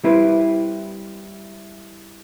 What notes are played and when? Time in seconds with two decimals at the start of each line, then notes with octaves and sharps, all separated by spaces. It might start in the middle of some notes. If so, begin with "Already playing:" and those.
0.04 G3 C4 E4 B4